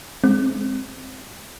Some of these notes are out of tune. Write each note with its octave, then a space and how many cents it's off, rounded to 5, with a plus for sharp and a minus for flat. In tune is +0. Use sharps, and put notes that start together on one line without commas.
G#3 -5 C4 +0